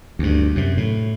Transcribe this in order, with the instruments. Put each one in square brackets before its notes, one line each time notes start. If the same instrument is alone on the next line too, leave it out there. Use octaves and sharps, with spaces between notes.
[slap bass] D2 G2
F#2 C3
A2